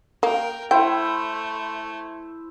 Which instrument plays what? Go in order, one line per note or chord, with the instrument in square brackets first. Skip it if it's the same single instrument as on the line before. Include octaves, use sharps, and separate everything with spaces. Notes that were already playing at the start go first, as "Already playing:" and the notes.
[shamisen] A#3 [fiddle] A#4 G5
[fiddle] A3 [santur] E4 C5 [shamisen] G5